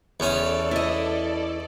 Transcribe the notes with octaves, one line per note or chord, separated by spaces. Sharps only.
E2 C#4 A4 D5
E4 D#5